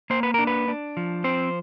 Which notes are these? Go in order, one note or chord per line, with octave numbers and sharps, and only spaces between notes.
A#3 C5
B4
D4 A#4
B4
D4
F3
C4 C5